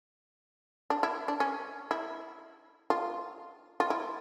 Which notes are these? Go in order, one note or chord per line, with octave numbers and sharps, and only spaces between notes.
D4
E4
D4
C#4
E4
F4
F4
E4